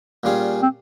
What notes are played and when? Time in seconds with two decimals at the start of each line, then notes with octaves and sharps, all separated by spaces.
0.23 A#2 G3 C#4 F4 G#4
0.63 C4